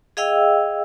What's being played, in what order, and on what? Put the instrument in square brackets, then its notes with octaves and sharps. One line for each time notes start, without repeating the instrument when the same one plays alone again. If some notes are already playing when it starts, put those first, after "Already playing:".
[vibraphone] G#4 D#5 F5 G5 E6